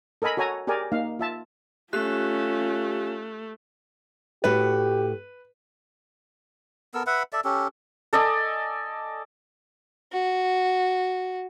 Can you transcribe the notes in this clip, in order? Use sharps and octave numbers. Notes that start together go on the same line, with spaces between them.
A4 A#4 D#5 G#5 B5
F#4 A4 C#5 G#5 A#5
G4 G#4 A#4 D5 G#5
A#3 D#4 F5
F4 E5 A5
A3 C#4 F4 G4 F#6
A2 A3 F#4 G4 B4
B3 A4 A#4 E6
B4 E5 F#5 B5
A4 D5 E5
C#4 G4 A4
A4 D5 D#5 G#5
F#4